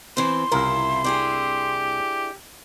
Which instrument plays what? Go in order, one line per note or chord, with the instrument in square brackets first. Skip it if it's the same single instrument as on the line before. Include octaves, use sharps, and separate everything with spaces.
[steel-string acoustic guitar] E3 C4 [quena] C6
[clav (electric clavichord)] C2 A#4 [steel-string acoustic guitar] C#3 E4 F4
[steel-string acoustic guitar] D4 E4 G#4 [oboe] G4